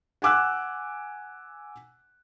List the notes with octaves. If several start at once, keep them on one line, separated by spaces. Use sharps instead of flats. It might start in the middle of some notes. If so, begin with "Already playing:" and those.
F#5 G#5 D6 E6 F#6